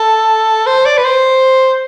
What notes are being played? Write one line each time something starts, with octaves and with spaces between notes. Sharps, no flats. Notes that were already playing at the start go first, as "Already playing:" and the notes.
Already playing: A4
C5
D5
B4
C5